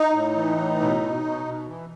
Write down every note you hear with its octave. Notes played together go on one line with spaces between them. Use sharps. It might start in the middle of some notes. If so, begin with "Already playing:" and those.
Already playing: D#4
A2
E3
A2
B2
B2
B2
B2
E3